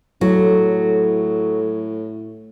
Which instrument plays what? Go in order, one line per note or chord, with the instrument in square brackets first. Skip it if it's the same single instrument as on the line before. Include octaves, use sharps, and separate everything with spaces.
[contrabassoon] A2 [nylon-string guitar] F#3 [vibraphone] A4